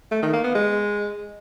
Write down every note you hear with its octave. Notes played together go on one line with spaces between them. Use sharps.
A3
D#3
A#3
B3
G#3